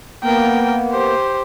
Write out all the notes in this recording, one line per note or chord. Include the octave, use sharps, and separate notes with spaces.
A#3 B3 A#4 G5
G4 C5